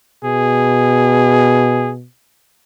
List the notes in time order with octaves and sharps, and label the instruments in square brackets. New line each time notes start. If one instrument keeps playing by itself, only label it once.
[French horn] B2 [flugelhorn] G#4